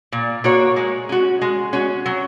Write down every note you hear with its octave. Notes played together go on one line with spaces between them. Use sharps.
A#2
A#3 F#4 C#5
G#3
C#4 F#4
G#3
C#4 F#4
F#3